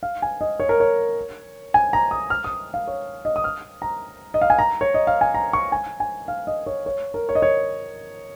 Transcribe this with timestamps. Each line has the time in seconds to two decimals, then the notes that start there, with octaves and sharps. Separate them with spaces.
0.03 F5
0.22 G#5
0.41 D#5
0.60 C#5
0.69 A#4
0.80 C#5
1.74 G#5
1.93 A#5
2.11 D#6
2.30 F6
2.44 D#6
2.74 F5
2.87 C#5
3.25 D#5
3.36 D#6
3.44 F6
3.82 A#5
4.34 D#5
4.42 F5
4.50 G#5
4.59 A#5
4.81 C#5
4.94 D#5
5.07 F5
5.21 G#5
5.34 A#5
5.53 C#6
5.72 G#5
6.00 G#5
6.28 F5
6.47 D#5
6.66 C#5
6.86 C#5
7.14 A#4
7.29 C#5
7.35 D#5
7.42 C#5